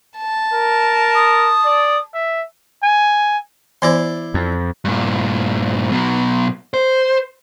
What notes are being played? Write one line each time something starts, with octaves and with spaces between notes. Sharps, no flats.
A5
A#4
D#6
D5
E5
G#5
E3 B3 E4 C5 D5 C6
F2
G2 A#2
B2 F#3
C5